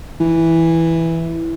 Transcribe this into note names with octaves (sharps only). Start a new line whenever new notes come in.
E3